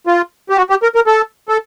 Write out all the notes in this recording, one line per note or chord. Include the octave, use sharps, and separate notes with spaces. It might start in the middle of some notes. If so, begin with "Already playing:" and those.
F4
G4
F#4
G4
A#4
A#4
A4
A4